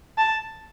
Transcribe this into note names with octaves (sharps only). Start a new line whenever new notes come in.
A5